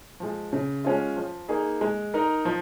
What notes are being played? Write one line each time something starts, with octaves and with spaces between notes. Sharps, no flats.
F3 G#3
C#3
G#3 C#4 F4
F3
A#3 D#4 G#4
G#3
D#4 A#4
F3